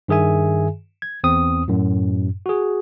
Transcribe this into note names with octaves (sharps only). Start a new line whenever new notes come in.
G2 D#3 G#4 E5 G#5
G#6
E2 C4 D#6
F#2 A2
F#4 G#4